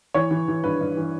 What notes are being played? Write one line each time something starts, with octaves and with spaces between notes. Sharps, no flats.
E3 C#5
E3
E3
G2 B4
G2
E3